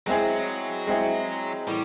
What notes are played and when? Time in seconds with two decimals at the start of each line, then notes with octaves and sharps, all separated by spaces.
0.07 F#3 G#3 C4 E4 G#4
0.87 G#3 C4 E4 G#4
1.68 A2 E3 G3